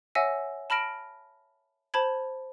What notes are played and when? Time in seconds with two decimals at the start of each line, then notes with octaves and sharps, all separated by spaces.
0.15 C#5 E5 F#5 G#5 E6 A#6
0.70 A5 B5 F6 A#6 D7
1.94 C5 A5 B5 G#6